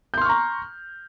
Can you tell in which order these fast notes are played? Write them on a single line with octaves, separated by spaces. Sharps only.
G6 C6 F6 C#6 A#5